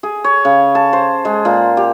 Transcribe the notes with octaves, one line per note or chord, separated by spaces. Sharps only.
G#4
C#5
C#3
A5
C5
G#3
A#2
G4